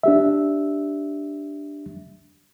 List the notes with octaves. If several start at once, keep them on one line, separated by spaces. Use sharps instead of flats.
D4 G4 E5